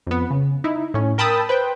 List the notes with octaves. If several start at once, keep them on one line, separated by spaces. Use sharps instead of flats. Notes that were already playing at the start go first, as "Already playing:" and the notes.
F2 B3
C#3
D#4 E4
A2 C#4
A#4 G5 A5 B5 D#6 E6
B4 C5 G5